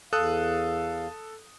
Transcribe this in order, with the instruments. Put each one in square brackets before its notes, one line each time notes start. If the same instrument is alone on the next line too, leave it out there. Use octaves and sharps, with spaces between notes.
[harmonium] E2 F5 [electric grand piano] A4 D#6 F#6